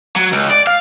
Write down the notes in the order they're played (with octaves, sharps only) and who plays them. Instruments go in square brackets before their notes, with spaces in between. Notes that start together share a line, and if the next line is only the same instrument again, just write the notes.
[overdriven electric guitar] F#3
C#2
D5
F5